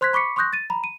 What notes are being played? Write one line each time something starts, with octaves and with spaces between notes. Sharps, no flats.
C5 C6 F#6 G#6 B6
B5 C#6 D6 B6 C#7
C6 C#6 D#6 F#6 G6 A#6
A6 D#7
A#5 B5
D#7